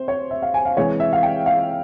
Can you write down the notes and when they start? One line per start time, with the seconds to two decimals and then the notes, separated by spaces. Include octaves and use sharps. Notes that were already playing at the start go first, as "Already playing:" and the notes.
Already playing: C3 C5
0.08 C#5
0.31 E5
0.42 F5
0.54 G#5
0.65 F5
0.77 C3 E3 G#3 C#5
1.00 E5
1.13 F5
1.23 G5
1.46 F5